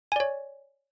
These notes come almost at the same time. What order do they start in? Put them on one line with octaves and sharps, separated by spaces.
G#5 D5 C#5